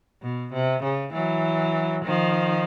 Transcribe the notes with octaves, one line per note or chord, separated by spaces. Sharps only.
B2
C3
C#3
E3 F#3
D#3 F3